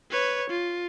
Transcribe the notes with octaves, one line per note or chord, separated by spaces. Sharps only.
B4 C#5
F4